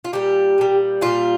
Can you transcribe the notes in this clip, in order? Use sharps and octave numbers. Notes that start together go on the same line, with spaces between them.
F4
A#2 G3 G4
A#2 G3
A#2 G3 F4